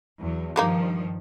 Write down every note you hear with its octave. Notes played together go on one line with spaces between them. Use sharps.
E2 F#3
G2 D#3 F3 G3 A#3 D#4